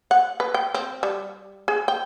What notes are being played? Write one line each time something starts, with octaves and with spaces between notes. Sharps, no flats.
F#5
B4
G5
C4
G3
G#4
G5